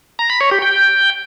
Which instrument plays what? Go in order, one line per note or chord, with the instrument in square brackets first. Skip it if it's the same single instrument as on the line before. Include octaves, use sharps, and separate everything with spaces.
[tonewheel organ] A#5
B5
C#5
G4
G5